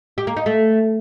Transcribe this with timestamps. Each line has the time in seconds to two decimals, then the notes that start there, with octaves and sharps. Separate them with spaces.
0.18 G4
0.27 A#3
0.37 D#4
0.46 A3